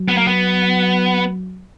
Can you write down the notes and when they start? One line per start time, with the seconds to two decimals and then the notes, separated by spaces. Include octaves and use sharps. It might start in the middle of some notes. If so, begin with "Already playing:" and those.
Already playing: F#3
0.08 B3
0.18 A#3
0.27 B3